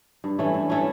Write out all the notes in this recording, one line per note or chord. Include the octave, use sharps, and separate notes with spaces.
G2
E3 A3 C#4
G2
E3 A3 C#4